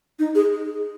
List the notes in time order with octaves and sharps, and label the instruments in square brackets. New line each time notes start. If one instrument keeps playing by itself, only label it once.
[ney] D#4
G#4